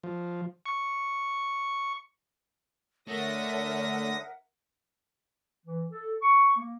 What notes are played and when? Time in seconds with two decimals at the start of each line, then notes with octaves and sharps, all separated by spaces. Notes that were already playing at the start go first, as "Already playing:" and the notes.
0.04 F3
0.66 C#6
3.07 D3 A3 A#4 C#5 E5 F#5 D#6 A#6
5.66 E3
5.91 A4
6.22 C#6
6.57 A#3